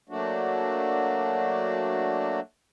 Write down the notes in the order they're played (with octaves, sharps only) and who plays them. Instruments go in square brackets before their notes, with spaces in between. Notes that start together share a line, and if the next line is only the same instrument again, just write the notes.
[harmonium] F#3 A3 A#3 D4 F#4